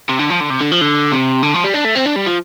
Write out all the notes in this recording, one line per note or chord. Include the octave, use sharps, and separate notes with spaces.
C3
D3
F3
D3
C3
D3
F3
D3
C3
D3
F3
G3
D4
A3
C4
D4
G3
F3